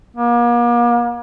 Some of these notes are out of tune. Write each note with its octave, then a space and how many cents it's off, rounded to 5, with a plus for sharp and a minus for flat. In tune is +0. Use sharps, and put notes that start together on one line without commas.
A#3 +40